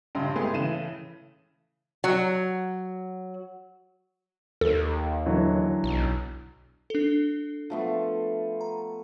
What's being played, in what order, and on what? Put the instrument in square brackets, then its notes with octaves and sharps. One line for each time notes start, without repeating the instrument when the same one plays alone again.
[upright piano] A#1 G2 C#3 G5 C6
G#3 A3 B3 G4 G#4
A2 C#3 E3 A3 D#7 E7
[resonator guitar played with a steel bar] F#3
[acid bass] D#2 [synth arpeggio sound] A4
[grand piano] D3 E3 F#3
[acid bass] B1
[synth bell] D4 A4
[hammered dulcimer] F3 A3 B3
[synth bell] A#5